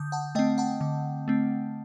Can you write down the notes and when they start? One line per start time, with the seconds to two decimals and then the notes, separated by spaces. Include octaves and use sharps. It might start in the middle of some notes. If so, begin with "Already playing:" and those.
Already playing: D3 D#6 G6
0.12 F#5 A5
0.35 A3 C4 D#5 G5
0.58 F#5 A5
0.81 D3
1.28 A3 C4